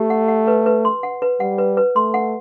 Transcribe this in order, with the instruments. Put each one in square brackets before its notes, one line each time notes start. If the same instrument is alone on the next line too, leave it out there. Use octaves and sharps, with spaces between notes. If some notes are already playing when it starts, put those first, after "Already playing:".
Already playing: [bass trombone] A3 [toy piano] G4
[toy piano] F#5
F#5
B4
B4
C6
F#5
B4
[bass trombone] G3 [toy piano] F#5
[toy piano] B4
B4
[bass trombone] A3 [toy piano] C6
[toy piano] F#5